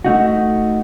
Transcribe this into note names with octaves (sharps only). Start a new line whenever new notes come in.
A3 D#4 F#4